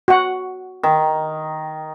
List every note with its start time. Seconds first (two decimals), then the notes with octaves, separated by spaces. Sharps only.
0.08 F#4 F#5
0.83 D#3